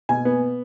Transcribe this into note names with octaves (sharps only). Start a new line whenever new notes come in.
B2 G#5
B3